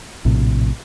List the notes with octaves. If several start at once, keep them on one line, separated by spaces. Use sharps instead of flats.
A#1 A2 C3